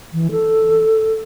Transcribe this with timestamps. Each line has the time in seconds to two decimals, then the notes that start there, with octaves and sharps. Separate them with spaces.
0.13 E3
0.31 A4